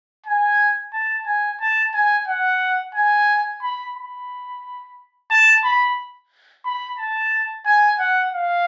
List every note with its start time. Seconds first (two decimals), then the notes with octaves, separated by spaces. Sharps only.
0.26 G#5
0.93 A5
1.27 G#5
1.61 A5
1.94 G#5
2.28 F#5
2.95 G#5
3.62 B5
3.96 B5
5.31 A5
5.64 B5
6.65 B5
6.98 A5
7.66 G#5
7.99 F#5
8.33 F5